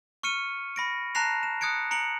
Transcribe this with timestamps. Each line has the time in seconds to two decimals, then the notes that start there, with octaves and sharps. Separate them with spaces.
0.23 C#6 F6 C#7 D#7
0.76 B5 A#6 D7
1.15 A5 A#5 F#6 A#6 C7 F7
1.43 E7
1.61 D#6 F#6 G#6 C#7 D7
1.91 A#5 C#7 D7 F#7